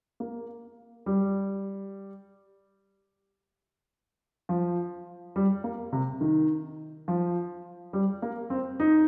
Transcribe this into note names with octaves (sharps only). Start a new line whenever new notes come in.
A#3
G3
F3
G3
A#3
C3
D#3
F3
G3
A#3
C4
D#4